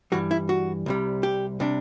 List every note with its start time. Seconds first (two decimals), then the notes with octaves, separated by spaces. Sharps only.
0.12 G2 E3 G3 F#4
0.31 E4
0.49 F#4
0.86 C2 C3 G3
1.23 G4
1.60 C3 G3 D4